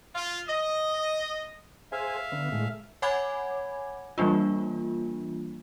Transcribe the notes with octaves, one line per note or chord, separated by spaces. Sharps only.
F4
D#5
G#4 C5 E5 F5 G#5
D3 B3
A2 G#3
C#5 F#5 G#5 B5 D6 G#6
E3 G3 A#3 D4 F4